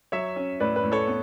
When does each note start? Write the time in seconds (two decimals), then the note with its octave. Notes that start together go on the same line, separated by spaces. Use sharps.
0.12 F#3 C#5 E5
0.36 C#4
0.60 A2 B4 D5
0.76 B4
0.84 A2
0.92 A4 C#5
1.07 B3